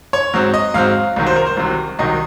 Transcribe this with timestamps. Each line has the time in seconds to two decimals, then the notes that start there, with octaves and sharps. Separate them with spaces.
0.13 C#5
0.34 G#2 F#3 C4
0.54 D#5
0.74 G#2 F#3 C4 F5
1.16 C2 C3 D#3 F#3
1.27 C5
1.36 A#4
1.47 C5
1.57 C2 C3 D#3 F#3
1.99 C2 C3 D#3 F#3 D#5